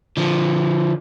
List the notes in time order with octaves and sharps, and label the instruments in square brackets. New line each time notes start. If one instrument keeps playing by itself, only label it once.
[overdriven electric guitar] D3 F3